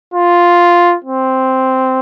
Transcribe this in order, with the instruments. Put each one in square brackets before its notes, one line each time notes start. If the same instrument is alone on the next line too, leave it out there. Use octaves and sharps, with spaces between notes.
[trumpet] F4
C4